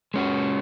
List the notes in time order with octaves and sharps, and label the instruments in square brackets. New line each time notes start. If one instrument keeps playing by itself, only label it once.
[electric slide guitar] G#3 C#4 F#4